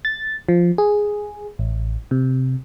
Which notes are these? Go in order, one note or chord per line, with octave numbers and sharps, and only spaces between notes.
A6
F3
G#4
A1
C3